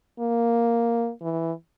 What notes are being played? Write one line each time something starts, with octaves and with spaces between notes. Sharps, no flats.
A#3
E3